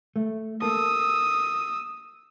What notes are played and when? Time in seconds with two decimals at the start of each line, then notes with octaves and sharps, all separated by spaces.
0.16 A3
0.62 A#3 A4 D#6 E6